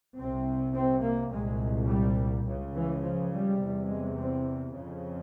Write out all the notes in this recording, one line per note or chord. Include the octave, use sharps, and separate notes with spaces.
C2 C3 C4
C4
A#3
C2 A#2 G#3
G3
C#2 C#3
E3
F3
G3
E2 C3
G#3
C4
F2 C#3